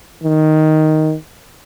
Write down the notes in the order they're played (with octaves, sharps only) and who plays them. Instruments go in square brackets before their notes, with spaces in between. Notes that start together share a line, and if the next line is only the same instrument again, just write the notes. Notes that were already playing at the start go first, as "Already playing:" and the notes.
[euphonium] D#3